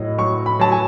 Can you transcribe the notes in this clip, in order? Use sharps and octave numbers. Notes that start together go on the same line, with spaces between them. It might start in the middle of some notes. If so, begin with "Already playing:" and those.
Already playing: A2 F#3 D#5
F#3 C#6
B5
F#3 A5
G#5